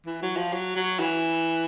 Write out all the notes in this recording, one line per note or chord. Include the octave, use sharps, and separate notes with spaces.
E3
F#3
F3
F#3
F#3
E3